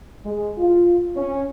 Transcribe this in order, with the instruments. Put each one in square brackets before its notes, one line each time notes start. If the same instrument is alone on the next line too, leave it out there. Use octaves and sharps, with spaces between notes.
[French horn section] G#3
F4
C#4